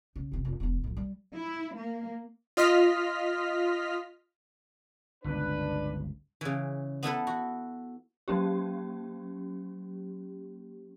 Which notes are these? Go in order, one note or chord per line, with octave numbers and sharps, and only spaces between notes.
C#3
F1 C3
F1
E1 E2
A2 F3
G3
E4
A#3
F4 D#5 F6 B6
G1 C#2 D4 B4
C#3 E3
B3 E4 A4 B4
F#4
F#3 A#3 C#4 G4